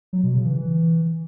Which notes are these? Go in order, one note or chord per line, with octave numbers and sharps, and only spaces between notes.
F#3
B2
C#3
E3
E3